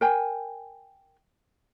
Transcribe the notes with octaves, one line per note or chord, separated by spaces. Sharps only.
A#4 G5 G#5